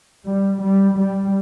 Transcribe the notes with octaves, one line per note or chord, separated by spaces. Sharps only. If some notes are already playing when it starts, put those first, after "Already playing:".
G3
G3
G3